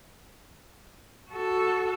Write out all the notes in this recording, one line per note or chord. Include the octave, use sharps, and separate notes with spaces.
F#4 A4